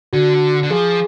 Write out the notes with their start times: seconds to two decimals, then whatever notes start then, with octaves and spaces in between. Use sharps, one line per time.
0.13 D3 F#4
0.63 D3
0.70 F3 G#4